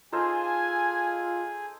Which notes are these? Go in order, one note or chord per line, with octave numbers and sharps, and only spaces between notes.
D#4 F4 G#4 A4 C5 G#5